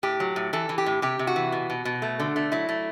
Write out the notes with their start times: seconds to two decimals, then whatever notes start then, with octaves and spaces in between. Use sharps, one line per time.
0.03 A2 G4
0.20 F#3
0.36 A2
0.53 E3 A4
0.69 E3
0.78 G4
0.86 A2
1.02 C3 G4
1.19 C3
1.27 F#4
1.36 E3
1.52 B2
1.70 B2
1.85 B2
2.02 A3
2.20 D3
2.36 A3
2.52 F#3 E4
2.69 A3